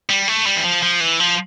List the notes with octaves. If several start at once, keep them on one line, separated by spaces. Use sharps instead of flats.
G3
A3
G3
E3
F3
F3
E3
F3